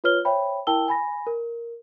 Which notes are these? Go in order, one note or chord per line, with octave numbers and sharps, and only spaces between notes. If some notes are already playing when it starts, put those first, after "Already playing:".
F4 B4 C#5 F6 G7
C5 C#5 E5 G5 B5
E4 A#4 G5 A5 E6 G7
G#5 B5 A#6
A#4